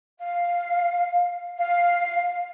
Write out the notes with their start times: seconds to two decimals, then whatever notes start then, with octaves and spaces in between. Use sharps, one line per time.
0.20 F5
1.59 F5